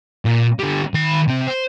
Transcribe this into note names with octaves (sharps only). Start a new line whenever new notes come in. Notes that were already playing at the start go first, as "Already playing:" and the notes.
A#2
D3 G3
D#3 B5
C3 C4
C5